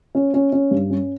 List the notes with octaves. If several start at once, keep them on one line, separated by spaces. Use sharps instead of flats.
C#4
C#4
C#4
G2
C#4